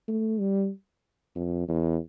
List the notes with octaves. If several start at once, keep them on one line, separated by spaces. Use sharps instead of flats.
A3
G3
F2
E2